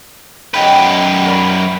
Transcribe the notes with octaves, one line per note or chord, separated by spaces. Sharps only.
F#2 B4 D#5 G5 G6
A#4 D5 B5